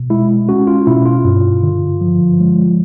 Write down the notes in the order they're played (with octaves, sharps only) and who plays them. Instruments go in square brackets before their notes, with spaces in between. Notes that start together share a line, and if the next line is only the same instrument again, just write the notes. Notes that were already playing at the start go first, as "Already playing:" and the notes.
Already playing: [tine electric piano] B2
G#3 E4
C#4 F#4
F4
B2 E4
F4
G2
D3
F3
G#3